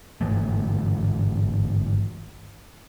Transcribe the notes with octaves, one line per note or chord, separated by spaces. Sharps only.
G1 G#2 E3 A3